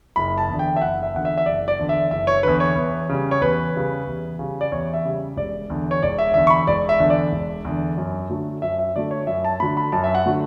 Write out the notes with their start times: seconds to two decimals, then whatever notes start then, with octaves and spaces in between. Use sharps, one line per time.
0.16 F#1 B5
0.38 A5
0.48 E2 D3
0.59 G5
0.76 E5
0.81 F#1 F#5
1.03 E5
1.14 E2 D3 F#5
1.25 E5
1.38 E5
1.46 F#1 D5
1.68 D5
1.79 E2 D3
1.89 E5
2.11 F#1 E5
2.27 C#5
2.43 E2 D3 B4
2.60 C#5
2.76 E2
3.09 C#3 G3
3.31 C#5
3.41 E2 B4
3.75 C#3 G3
4.07 E2
4.39 C#3 G3
4.61 D5
4.72 E2 C#5
4.94 E5
5.05 C#3 G3
5.37 E1 D5
5.70 E2 D3
5.91 C#5
6.03 E1 D5
6.18 E5
6.34 E2 D3 E5
6.47 C#6
6.50 B5
6.67 E1 D5
6.89 E5
7.00 E2 D3
7.10 D5
7.32 E1
7.65 E2 D3
7.98 F#2
8.30 D3 F#3 A3
8.62 F#2 E5
8.79 E5
8.96 D3 F#3 A3 D5
9.11 C#5
9.27 F#2 E5
9.45 A5
9.60 D3 F#3 A3 B5
9.77 B5
9.92 F#2 A5
10.04 E5
10.15 F#5
10.26 D3 F#3 A3